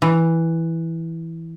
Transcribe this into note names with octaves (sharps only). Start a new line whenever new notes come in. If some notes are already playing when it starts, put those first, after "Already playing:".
E3